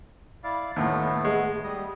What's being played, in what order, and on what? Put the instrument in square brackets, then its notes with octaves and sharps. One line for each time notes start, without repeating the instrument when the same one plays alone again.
[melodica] E4 D5 F5
[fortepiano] D#2 A2 [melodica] A3 B3
[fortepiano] G#3
[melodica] G3 D#5